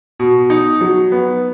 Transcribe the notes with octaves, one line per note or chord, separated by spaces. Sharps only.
B2
D#4
F#3
B3